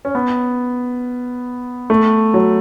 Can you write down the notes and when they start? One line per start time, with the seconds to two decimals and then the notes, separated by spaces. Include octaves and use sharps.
0.05 C#4
0.15 B3
1.90 A3
2.34 F#3